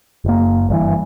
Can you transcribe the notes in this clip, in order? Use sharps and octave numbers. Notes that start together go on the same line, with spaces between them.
F#1 A#3
G1 G2 B2 E3